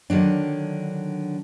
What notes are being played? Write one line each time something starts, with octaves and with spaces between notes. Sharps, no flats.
D3 D#3 F#3 D4